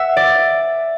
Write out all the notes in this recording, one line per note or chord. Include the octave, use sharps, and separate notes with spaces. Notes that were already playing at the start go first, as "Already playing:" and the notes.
Already playing: E5 F#5
D5